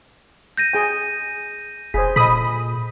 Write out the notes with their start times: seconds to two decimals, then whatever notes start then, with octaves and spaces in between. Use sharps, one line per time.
0.57 G6 A#6 D#7
0.73 G#4 G5
1.94 E1 G#4 C5 B6
2.16 A#2 A4 D#5 B5 D#6